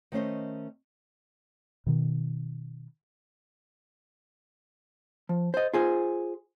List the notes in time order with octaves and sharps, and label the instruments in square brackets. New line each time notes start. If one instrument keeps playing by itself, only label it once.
[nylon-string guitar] D#3 A3 C#4 C5 D#5
[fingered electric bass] B2 D#3
[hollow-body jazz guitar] F3
C5 D#5
F4 G#4 C5